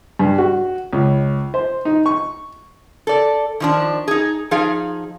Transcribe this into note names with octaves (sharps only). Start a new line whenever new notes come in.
G2
F#4
C#2
C5
D#4
C#6
A4 D5
D#3 F3 D4
D#4 G#4
F3 D#4 G#4 F5